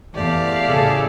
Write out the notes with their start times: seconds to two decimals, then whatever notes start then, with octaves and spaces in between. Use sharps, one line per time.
0.15 E2 A3 G4 D5 F5
0.66 A2 C#3 G#4 A4